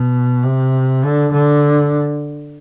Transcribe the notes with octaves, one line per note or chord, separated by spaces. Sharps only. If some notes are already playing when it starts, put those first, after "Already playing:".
Already playing: B2
C3
D3
D3